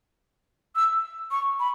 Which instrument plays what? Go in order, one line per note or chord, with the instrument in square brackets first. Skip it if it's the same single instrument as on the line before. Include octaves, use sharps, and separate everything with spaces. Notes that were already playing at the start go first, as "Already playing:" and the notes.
[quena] E6
C#6
B5